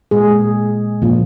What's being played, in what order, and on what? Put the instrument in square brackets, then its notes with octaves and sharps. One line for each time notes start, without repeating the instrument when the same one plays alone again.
[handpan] A#2 G#3 G#4
A#2 F3 A#3